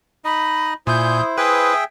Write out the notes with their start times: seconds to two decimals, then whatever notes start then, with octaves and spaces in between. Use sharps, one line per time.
0.25 D#4 D#5 B5
0.87 A#2 E4 C5 G#5 D#6 G6
1.38 G#4 B4 E5 G5 D#6